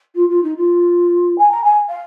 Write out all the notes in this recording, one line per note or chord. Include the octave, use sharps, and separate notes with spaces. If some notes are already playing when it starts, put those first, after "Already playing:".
F4
F4
D#4
F4
G#5
A#5
G#5
F5